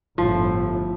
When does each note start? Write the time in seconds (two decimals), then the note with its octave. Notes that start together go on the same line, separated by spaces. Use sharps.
0.18 G1 A2 F3